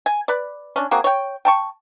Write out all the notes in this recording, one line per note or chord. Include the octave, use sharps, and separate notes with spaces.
G#5
B4 D5
C#4 D4
A#3 C4 F#4 G#4
C#5 G5
G5 A5 C#6